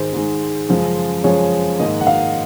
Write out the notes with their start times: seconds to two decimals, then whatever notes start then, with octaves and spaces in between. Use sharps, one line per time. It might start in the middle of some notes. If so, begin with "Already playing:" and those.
Already playing: G#2 D#3 G#3 C5
0.12 G#2 D#3 G#3
0.69 F#2 C#3 F3 G#3
1.24 F#2 C#3 F3 G#3 C#5
1.79 G#2 D#3 A#3 D#5
2.00 F#5
2.07 F5